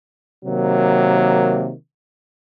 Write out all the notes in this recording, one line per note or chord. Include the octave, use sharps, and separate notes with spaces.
C3 D#3 F#3 A#3